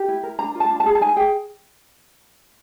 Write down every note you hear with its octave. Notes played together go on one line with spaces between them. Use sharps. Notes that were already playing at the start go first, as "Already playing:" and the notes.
Already playing: G4
E4
A#4
D4 A#5
F4
A5
D4
A5
G#4
A5
D#4 G#5
G#4 G5